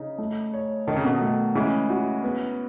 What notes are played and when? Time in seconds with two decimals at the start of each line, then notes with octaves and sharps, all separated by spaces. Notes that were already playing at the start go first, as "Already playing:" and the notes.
Already playing: C#3 D#4
0.18 A3
0.54 C#5
0.87 D#3 A4
0.96 C#3
1.05 B2 D#3
1.21 A3
1.55 C#3 E3 G#3
1.90 F#4
2.24 B3